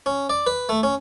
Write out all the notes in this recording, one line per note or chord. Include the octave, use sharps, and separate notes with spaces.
C#4
D5
B4
A3
C#4